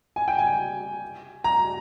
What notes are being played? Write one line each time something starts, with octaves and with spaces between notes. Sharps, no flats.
G#5
G5
G#5
A#5